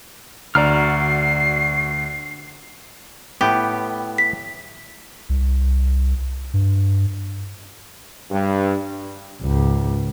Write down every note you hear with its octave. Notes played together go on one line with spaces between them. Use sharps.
D2 F#4 D5 A#5 F6 C7
A2 B3 G4
B6
C2
G2
G2
C#2 G#2